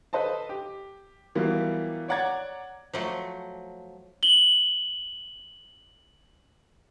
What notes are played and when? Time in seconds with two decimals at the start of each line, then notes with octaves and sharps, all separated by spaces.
0.13 A4 B4 C5 D#5 A5
0.49 G4
1.35 E3 F#3 G3 A#3 B3 F4
2.08 C#5 D5 F#5 A#5 G#6 A6
2.93 F3 F#3 A3
4.23 F#7 G7